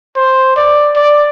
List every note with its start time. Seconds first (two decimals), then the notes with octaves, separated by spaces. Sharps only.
0.16 C5
0.56 D5
0.96 D5